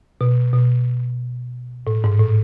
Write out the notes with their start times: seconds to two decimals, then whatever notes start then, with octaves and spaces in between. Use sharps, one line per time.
0.21 B2
0.53 B2
1.87 A2
2.04 G#2
2.20 A2